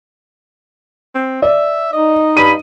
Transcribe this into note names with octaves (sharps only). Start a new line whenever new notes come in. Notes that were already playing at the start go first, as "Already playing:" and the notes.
C4
D5 E5
D#4 D#5
G2 B5 D#7